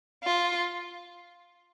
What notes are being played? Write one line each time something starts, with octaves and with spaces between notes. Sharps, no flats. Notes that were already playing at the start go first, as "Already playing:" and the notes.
F4